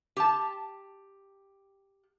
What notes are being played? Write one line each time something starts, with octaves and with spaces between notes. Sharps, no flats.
G4 A5